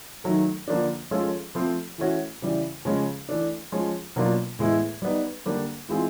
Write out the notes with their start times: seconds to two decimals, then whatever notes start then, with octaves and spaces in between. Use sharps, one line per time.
0.24 D#3 F#3 A3
0.68 D3 F3 A#3 D4
1.11 F3 G#3 C#4 F4 A4
1.55 F3 A3 C4
1.98 E3 A3 C#4 F#4
2.42 C#3 E3 G3
2.85 C#3 F3 G#3 C#4
3.29 E3 A3 D4
3.72 F3 G#3 C#4
4.16 B2 F#3 A#3 D4 F4
4.59 A2 E3 G#3 B3 E4
5.02 G3 B3 D#4
5.46 D3 G3 A#3 D4
5.88 E3 G#3 C4 F4 G#4